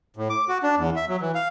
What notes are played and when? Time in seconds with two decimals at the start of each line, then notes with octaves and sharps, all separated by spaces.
0.17 A2
0.30 D6
0.49 F#4
0.63 D4
0.77 E2
0.96 E5
1.08 F#3
1.21 E3
1.35 F5